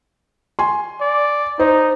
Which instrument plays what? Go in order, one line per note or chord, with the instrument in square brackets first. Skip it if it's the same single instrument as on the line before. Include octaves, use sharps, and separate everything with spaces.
[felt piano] G#5 C6
[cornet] D5
[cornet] D#4 [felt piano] C5